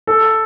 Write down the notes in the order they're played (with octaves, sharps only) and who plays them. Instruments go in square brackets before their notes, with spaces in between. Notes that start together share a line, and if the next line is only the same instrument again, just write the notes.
[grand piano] A4